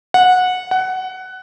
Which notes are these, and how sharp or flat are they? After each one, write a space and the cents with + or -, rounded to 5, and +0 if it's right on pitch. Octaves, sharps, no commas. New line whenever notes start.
F#5 -15
F#5 +15